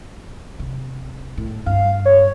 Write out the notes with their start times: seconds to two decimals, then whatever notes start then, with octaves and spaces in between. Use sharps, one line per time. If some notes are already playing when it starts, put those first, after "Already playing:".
0.59 C3
1.37 A2
1.66 G2 F5
2.05 C#5